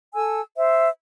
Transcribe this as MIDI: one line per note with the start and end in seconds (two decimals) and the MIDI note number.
0.14 0.41 69
0.14 0.41 80
0.14 0.41 88
0.57 0.88 72
0.57 0.88 76